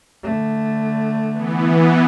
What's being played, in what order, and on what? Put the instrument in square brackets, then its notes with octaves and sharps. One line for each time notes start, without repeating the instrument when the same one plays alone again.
[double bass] D3 A3
[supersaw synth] E3 B3